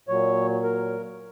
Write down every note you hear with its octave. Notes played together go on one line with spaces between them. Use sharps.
A#2 F#3 C#5
A#4